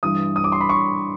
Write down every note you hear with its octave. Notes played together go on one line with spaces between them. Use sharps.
G2 E3 G3 D#6
D#6
D6
C6
B5
C#6